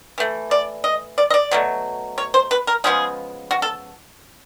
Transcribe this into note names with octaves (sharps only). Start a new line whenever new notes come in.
E3 A3
D5
D#5
D5
D#5
D5
B2 F#3 A3
C#5
C5
B4
A#4
C#3 F3 G#3 B3 G#4
F#4
A4